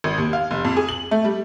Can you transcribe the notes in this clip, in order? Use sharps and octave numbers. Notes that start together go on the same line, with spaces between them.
G#1
D#2
F5
F1
F2
G#4
F#7
A3
G3